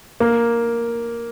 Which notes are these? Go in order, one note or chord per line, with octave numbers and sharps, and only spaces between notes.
A#3